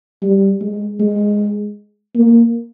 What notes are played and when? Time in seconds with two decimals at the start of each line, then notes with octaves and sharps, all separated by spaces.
0.22 G3
0.61 G#3
1.00 G#3
2.15 A#3